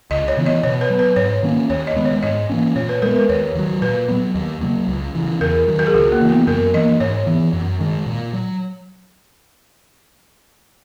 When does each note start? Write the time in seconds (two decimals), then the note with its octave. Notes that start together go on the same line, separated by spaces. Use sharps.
0.11 C#2 D#5
0.28 C#5
0.37 C#3 E3 B3
0.46 D#5
0.63 B2 C#5
0.81 B4
0.90 F#3 B3
0.99 B4
1.16 G#2 C#5
1.43 D#3 A#3 C#4
1.70 D#2 C#5
1.87 D#5
1.96 D#3 G#3 B3
2.05 C#5
2.23 G#2 D#5
2.49 E3 A#3 C#4
2.76 A#2 C#5
2.89 B4
3.02 G#3 B3 A#4
3.16 B4
3.29 D#2 C#5
3.55 D#3 F#3
3.82 A#2 B4
4.08 F#3 B3
4.35 D#2
4.61 C#3 F#3 A#3
4.88 C#2
5.15 C#3 E3
5.41 E2 A#4
5.68 D#3 F#3
5.79 A#4
5.87 G#4
5.94 C#2 F#4
6.12 A#3
6.21 C#3 E3
6.30 B3
6.47 F#2 A#4
6.74 E3 A#3 D#5
7.00 G#2 C#5
7.27 E3 B3
7.53 F#2
7.80 D#3 G#3
8.06 A#2
8.33 F#3